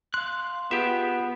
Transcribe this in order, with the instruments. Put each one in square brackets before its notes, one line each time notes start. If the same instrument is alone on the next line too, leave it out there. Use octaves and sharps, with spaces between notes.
[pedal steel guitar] F5 F#6 [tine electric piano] C6
[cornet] B3 [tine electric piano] F4 [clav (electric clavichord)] G4 E5 [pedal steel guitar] G#4